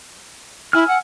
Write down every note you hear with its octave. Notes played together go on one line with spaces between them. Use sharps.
E4 G#5 E6 F6
F#5